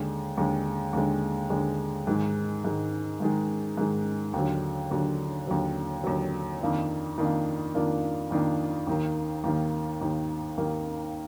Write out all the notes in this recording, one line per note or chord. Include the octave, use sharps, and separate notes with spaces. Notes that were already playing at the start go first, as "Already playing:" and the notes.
Already playing: D#2 D3 G#3
D#2 D3 G#3
D#2 D3 G#3
D#2 D3 G#3
G#2 D#3 G#3
G#2 D#3 G#3
G#2 D#3 G#3
G#2 D#3 G#3
D#2 D3 F#3
D#2 D3 F#3
D#2 D3 F#3
D#2 D3 F#3
F2 D#3 A#3 D4 F4
F2 D#3 A#3 D4 F4
F2 D#3 A#3 D4 F4
F2 D#3 A#3 D4 F4
D#2 D#3 A#3
D#2 D#3 A#3
D#2 D#3 A#3
D#2 D#3 A#3